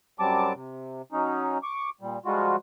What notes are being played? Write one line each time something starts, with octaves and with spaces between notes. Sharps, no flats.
F#2 F#3 G3 C4 A5 D6
C3
F#3 C#4 D#4
C#6 D6
A#2 G3
F3 G3 G#3 F4 F#4